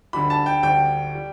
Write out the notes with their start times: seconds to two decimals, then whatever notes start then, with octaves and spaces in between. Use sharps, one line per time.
0.13 D2 D3 G3 B5
0.30 A5
0.46 G5
0.63 D2 D3 G3 G5
1.15 G3